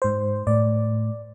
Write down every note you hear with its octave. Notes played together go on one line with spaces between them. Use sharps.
G#2 C5
A2 D5